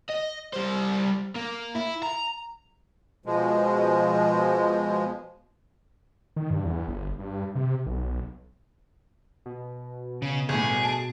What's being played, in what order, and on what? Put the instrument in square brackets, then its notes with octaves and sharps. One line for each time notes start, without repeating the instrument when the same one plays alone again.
[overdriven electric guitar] D#5
G3 C5
A#3
E4
A#5
[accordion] B2 F3 G#3
[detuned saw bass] D#3
G2
E2
G1
G2
C3
B1
[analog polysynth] B2
[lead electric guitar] C#3
[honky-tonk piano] G1 A2 [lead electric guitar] G#4
[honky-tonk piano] A5 D7